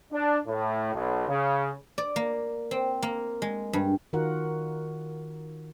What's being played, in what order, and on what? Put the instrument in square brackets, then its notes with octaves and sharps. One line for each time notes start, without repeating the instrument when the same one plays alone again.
[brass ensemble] D4
A2
B1
C#3
[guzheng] D5
A#3
C4
A#3
G#3
G2
[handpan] D#3 F4 F#4 A#4 F#5